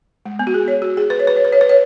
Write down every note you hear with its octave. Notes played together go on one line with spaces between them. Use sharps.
G#3
B3
F#4
G#4
C#5
F#4
G#4
B4
C#5
B4
C#5
B4
C#5
B4
C#5